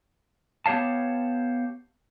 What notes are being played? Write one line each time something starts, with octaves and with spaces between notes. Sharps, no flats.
B3 G4 C#5 F5 A5